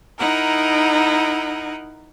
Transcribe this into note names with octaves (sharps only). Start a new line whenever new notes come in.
D#4 E4 A#4 F#5